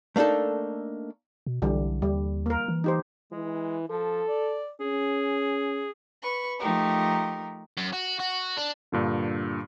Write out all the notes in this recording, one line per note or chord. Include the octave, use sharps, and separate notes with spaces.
A3 A#3 D4 D#4 A4
B2
B1 D3 E3 G3
D#2 G3
A#3 A#4
E3
D#4 G4 C5
E3 G#3
F3 A4
D5
C#4 G#4
B4 C#6
F3 A3 D#4 G4 A#4
F#2
F#4
F#4
D4
G2 A#2 D3